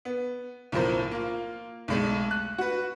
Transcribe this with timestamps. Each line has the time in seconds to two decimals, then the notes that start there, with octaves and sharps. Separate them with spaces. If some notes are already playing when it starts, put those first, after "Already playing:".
0.05 B3
0.72 B1 A2 F3 A#4 C5
1.11 A#3 F4
1.88 B1 G#3 A3
2.31 F#6
2.58 F#4 B4